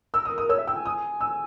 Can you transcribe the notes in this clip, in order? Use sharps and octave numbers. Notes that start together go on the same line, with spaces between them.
A#4 E6
D#6
D#6
C#5 E6
E5
G5 E6
G#5
D#6
E6